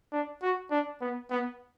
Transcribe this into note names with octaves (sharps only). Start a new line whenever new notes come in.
D4
F#4
D4
B3
B3